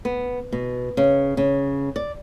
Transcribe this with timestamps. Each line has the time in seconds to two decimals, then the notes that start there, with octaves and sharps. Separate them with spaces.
0.05 B3
0.52 B2
0.97 C#3
1.37 C#3
1.96 D5